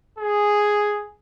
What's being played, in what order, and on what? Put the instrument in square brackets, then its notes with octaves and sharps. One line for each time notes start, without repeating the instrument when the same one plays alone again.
[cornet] G#4